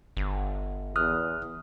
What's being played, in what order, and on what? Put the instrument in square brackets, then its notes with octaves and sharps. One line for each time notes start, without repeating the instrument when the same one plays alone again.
[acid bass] G1
[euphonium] E2 [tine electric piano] D#6 F6 F#6